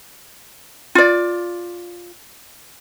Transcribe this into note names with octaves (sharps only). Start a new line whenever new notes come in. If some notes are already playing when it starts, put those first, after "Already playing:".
F4 D5